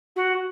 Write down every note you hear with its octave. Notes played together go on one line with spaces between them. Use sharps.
F#4